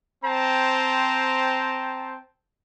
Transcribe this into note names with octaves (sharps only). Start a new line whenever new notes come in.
C4 C5 G5 A5 A#5